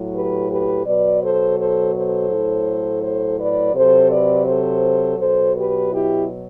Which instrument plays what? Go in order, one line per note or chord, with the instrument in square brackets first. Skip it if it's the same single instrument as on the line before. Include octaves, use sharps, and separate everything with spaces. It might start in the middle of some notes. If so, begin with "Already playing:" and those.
Already playing: [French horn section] A2 F#3
G4 B4
G4 B4
B2 F#3 B4 D5
A4 C5
A4 C5
A4 C5
A2 F#3
A4 C5
B4 D5
C3 F#3 A4 C5
B4 D5
A4 C5
B2 F#3 A4 C5
G4 B4
E4 G4